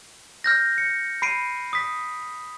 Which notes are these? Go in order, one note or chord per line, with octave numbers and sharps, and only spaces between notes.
F6 G6 A#6
C#7
B5 C7 D7 D#7
D#6 B6